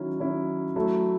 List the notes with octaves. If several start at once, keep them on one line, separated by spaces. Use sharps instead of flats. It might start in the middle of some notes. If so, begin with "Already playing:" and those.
Already playing: D#3 F#3 C#4 E4
D#3 F#3 C#4 E4
F#3 A3 E4 A4